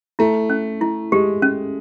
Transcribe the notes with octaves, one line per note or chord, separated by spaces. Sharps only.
A3 E4
C#4
E4
G#3 G4
C#4